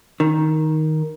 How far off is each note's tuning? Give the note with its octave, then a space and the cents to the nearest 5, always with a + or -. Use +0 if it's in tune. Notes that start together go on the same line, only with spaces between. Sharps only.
D#3 +5